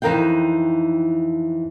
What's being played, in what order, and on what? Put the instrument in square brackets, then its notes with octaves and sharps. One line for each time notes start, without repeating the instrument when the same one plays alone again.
[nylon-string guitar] F2 E3 D#4 A#4 F5 G5